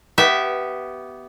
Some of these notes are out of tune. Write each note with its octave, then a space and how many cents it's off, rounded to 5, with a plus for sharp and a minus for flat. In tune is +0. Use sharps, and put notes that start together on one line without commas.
B3 +0 G4 -20 E5 +0